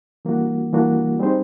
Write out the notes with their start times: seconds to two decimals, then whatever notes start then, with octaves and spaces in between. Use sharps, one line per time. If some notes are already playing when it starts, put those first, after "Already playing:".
0.25 E3 G3 A#3 D4 F#4
0.73 E3 G3 A#3 D4 F#4
1.20 G3 C4 D#4 G#4 C5